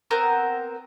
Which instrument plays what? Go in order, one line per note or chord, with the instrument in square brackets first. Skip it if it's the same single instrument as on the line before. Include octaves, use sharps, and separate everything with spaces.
[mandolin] B3 C4 A#4 C5